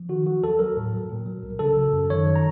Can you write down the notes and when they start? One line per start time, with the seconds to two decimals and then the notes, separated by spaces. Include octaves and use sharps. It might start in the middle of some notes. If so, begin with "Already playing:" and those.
Already playing: F3
0.09 D#3 F#4
0.26 F#3 F#4
0.43 D#2 A4
0.59 F#3 A#4
0.77 A2
0.93 F#3
1.09 A#2
1.26 F#3
1.43 C2
1.59 C#3 A4
1.77 F#3
1.93 F#2
2.10 D#3 C#5
2.27 F#3
2.36 A#5